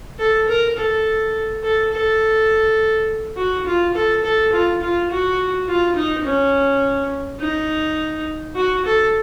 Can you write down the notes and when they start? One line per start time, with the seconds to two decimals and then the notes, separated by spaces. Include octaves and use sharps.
0.19 A4
0.48 A#4
0.77 A4
1.63 A4
1.92 A4
3.37 F#4
3.66 F4
3.94 A4
4.23 A4
4.53 F4
4.82 F4
5.10 F#4
5.68 F4
5.96 D#4
6.25 C#4
7.40 D#4
8.56 F#4
8.85 A4